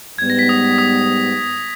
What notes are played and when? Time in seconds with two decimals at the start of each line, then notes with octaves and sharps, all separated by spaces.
0.18 G#2 G3 B3 G#6
0.30 A#6
0.39 B6
0.49 D#6
0.78 D#6